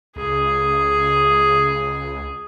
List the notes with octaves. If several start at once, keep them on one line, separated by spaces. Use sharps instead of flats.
C#2 G#4